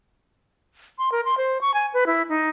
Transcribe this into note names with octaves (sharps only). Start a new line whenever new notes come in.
C6
A#4
C6
C5
C#6
G#5
B4
E4
D#4